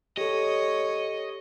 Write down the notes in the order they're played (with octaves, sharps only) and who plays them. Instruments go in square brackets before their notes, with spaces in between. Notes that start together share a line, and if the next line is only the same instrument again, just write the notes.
[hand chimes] G4 A4 [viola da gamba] C#5 [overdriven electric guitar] D#5